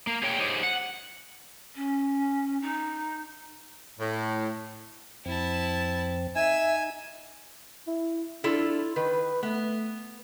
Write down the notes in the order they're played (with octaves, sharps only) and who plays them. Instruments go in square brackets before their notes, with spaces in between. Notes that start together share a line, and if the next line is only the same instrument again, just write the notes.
[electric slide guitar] A#3
G#4 C#5 G5
D#4 G4 G#4 C5 C#5
F#5
[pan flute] C#4
D#4
[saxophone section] A2
[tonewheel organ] F2 C4 [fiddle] E4 A5
[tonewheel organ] D#4 [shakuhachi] E5 [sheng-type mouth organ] G#5 [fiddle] E6
[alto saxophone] E4
[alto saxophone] D4 [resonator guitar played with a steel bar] E4 F4 A4
[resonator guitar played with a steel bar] D#3 [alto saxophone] B4
[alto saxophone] A3 [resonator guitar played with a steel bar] B3